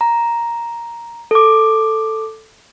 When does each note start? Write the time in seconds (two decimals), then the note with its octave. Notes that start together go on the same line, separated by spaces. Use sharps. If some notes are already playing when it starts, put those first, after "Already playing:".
0.01 A#5
1.31 A4 D6